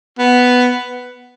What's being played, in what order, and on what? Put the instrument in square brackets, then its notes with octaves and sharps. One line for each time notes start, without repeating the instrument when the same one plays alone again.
[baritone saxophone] B3